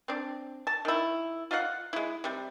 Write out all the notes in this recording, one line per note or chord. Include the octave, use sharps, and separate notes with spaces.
C4 D4
A5
D#3 E4
F4 D#5 F5 F#5
G#3 E4
C3 G3